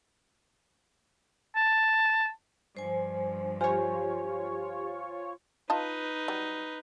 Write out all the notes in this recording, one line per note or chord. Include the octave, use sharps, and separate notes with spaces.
A5
G2 F3 C5 G#5
F4 G4 C5 C#5 G#5
D#4 F4 B4 D#5 A5
F#3 G3